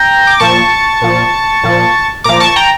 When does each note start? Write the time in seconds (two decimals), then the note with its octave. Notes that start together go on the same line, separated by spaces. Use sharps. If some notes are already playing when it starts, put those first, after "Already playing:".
Already playing: G5 A#5
0.27 D6
0.40 A#2 F3 A5 C#6
1.02 A#2 F3
1.63 A#2 F3
2.24 A#2 F3 A#5 D6
2.40 A5 C#6
2.56 G5 A#5